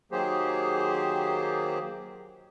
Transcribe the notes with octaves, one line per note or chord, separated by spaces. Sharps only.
D#3 F#3 A#3 G4 G#4 C5